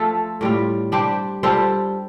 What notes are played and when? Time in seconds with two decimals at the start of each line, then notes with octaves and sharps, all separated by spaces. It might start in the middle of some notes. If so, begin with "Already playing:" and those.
Already playing: F3 A3 F4 A4
0.41 A2 G3 F4
0.92 G3 D4 G4 C5
1.43 G3 F4 A4 C5